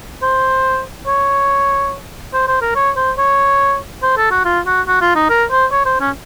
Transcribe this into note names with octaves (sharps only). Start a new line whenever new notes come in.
C5
C#5
C5
C5
A#4
C#5
C5
C#5
C5
A4
F#4
F4
F#4
F#4
F4
D#4
A#4
C5
C#5
C5
C#4